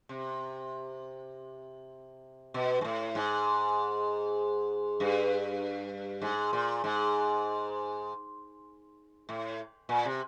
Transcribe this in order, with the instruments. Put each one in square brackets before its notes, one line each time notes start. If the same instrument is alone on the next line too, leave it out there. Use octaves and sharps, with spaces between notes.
[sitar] C3
B2
G#2
A2
G#2
G2
G#2
A#2
G#2
A2
A#2
C3